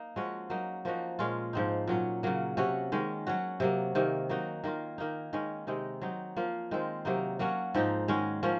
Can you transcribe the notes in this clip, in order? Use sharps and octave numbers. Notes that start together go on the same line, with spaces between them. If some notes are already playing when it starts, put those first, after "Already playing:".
Already playing: A#3 D#4
F3 G#3 C#4 F#4
F#3 A#3 D#4
F3 A#3 D#4 F#4
A#2 G#3 C#4 F4
G#2 F3 C4 D#4
A#2 F#3 C#4
C#3 F#3 A#3
C3 F#3 C#4 F#4
D#3 G#3 C#4
F#3 C#4 F#4
C3 F#3 A#3
C3 D#3 A#3
F#3 A#3 D#4 F#4
D#3 A#3 F4
D#3 A#3 D#4
D#3 G#3 C#4
C3 D#3 G#3 D#4
F#3 C4 D#4
F3 A#3 F4
D#3 G#3 C4 F4
C3 F#3 A#3 D#4
F#3 A#3 C#4 F#4
G#2 F3 C4 D#4
D#3 G#3 C#4 F#4
F3 A#3 C#4